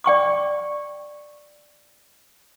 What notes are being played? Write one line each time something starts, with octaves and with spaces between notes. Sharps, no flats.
D5 G5 C#6 D6